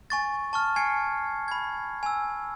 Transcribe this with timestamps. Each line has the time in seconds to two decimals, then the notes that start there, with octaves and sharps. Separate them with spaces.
0.10 G#5 C#6 A6
0.53 A5 C#6 F6
0.76 G#5 G#6 C7 C#7
1.48 B5 G#6
2.03 G#5 E6